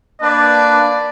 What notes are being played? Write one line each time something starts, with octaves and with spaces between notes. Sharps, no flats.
A#3 D4 B4 D5